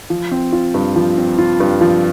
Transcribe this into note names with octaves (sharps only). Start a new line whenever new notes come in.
F3
C4
F4
G2
F3
C4
F4
G2
F3